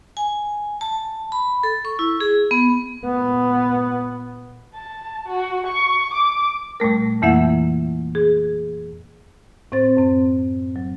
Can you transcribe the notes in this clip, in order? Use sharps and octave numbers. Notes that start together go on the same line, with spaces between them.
G#5
A5
B5
A4
C#6
E4
G#4
B3
A#2 B3
A5
F#4
C#6
D6
A#2 G3 A3 A#4
F2 E3 A#3 E4 E5 F#5
G#4
A2 C4 C5 A6
F#2 C4
F#3